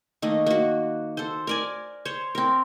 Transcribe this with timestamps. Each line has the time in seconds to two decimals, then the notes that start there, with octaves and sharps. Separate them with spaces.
0.22 D#3 A3 A#3 D#5
0.46 A#3 F#4
1.17 A4 C5
1.47 A#4 D5 G#5
2.05 C5 C#5
2.35 C4 A#4